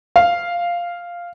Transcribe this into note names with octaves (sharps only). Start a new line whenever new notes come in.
F5